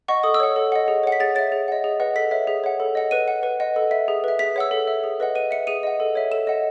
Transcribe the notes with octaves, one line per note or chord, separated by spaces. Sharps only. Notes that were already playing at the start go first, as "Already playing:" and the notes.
D#5 F#5 C#6
A4 D#6
E6
C#5 F#5
A4
D#5 F#5
G#4
C#5 F#5
B6
G#4 A6
C#5 E5 A6
G#4
D#5 F#5
G#4
B4 D#5 F#5
A4 B6
C#5 E5
G#4
C#5 F#5
A4
D#5 F#5
B4 D#7
F#5
B4
D#5 F#5
A4
E5
G#4
B4 E5
G#4 B6
C#5 F#5 E6
A4
E5
G#4
B4 D#5 F#5
B4 D#7
E5 C#7
G#4 D#7
D#5 F#5
A4
C#5 E5
A4 E7
D#5 F#5